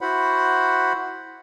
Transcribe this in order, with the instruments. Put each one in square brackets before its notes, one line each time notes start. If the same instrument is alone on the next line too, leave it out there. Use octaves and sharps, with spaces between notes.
[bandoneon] E4 F#4 C5 F#5 B5